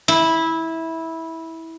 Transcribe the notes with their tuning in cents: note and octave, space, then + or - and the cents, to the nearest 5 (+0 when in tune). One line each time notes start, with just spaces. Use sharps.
E4 -15